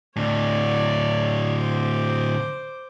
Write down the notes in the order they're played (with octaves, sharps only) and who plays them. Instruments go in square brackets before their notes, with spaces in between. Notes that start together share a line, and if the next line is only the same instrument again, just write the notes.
[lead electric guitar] A2 D3 [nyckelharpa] C#5 D5
[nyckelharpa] C5 D6